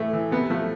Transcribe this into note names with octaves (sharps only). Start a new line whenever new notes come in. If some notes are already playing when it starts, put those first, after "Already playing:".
Already playing: A2 E3 A3
E3
C3 B3
F3 A3